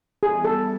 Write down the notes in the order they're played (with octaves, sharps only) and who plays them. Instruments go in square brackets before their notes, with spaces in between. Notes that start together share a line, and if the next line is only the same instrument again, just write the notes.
[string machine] E3 G3 B3 E4 [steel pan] G#4
[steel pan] A4